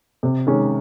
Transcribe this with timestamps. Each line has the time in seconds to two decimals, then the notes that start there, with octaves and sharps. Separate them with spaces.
0.23 C3
0.47 D#3 G#3 C#4